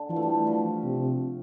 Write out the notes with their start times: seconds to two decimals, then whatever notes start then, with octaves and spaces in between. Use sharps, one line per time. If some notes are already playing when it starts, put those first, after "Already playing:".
Already playing: D3
0.10 E3 F3
0.16 A3
0.23 G3
0.34 G3
0.47 F3
0.84 C3